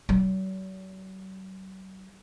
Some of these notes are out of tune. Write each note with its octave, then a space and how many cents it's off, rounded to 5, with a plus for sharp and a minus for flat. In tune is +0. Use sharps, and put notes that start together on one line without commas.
F#3 +45